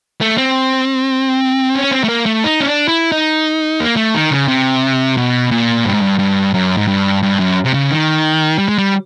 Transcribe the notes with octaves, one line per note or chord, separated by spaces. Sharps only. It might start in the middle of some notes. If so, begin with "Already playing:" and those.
A3
C4
C#4
C4
A3
A#3
A3
D#4
C#4
D4
E4
D#4
A#3
A3
D#3
C#3
C3
B2
A#2
G2
G#2
G2
G2
F#2
G#2
G2
G2
F#2
C3
C#3
D#3
G3
G#3
G3